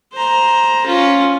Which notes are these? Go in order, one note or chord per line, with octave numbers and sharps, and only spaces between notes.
C5 A#5
C#4 F4